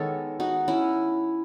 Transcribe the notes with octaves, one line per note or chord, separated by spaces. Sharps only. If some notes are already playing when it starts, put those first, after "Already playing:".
Already playing: D#3 G#3 B3 A4 C#5
D#4 F#4
C#4 E4